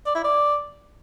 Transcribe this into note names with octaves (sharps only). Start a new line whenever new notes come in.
D5
E4
D5